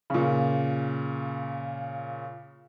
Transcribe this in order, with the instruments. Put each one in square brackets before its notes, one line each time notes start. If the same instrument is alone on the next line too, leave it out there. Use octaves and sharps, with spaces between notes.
[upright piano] A#2 C#3